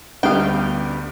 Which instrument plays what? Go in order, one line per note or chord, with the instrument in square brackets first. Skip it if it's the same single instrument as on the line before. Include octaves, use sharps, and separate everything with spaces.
[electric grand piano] D2 G3 B3 [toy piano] C#4 A4 [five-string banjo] F5 G5